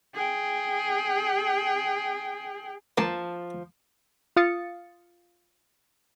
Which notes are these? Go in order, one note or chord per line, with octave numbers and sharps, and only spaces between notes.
G#4 G5
F3 A#3 A5
F4 F5 D#6 A6 C#7